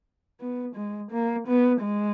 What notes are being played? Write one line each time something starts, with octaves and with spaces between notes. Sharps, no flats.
B3
G#3
A#3
B3
G#3